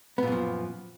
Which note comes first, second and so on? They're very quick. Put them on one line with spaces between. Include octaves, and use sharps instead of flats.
B3 A#2 F#2 F3